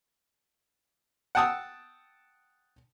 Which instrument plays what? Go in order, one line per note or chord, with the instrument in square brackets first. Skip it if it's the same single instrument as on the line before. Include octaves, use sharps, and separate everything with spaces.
[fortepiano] F#5 G5 A5 D#6 E6